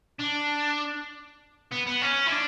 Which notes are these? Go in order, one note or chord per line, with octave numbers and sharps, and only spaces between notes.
D4
B3
B3
C#4
E4
D4